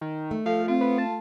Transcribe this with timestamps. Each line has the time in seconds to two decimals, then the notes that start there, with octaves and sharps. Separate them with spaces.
0.01 D#3
0.31 A3
0.46 F3 A4 F5
0.68 C4 F4
0.81 B3
0.98 A5